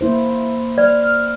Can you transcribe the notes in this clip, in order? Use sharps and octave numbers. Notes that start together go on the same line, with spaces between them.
A#3 E4 C5
D5 F6